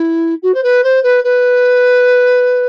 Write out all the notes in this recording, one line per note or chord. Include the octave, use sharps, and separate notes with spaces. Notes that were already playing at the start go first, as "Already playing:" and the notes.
Already playing: E4
F#4
C5
B4
C5
B4
B4